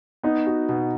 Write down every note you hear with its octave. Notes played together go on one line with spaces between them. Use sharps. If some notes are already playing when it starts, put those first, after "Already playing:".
B3 D#4
F#4
B2